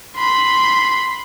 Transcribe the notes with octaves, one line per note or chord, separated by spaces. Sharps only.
B5 C6